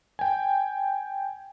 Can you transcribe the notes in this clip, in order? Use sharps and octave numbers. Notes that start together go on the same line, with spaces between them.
G5 G#5